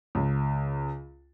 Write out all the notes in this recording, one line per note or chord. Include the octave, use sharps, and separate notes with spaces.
C#2